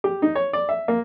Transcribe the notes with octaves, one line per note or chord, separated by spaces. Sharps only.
G4
D#4
C#5
D5
E5
A#3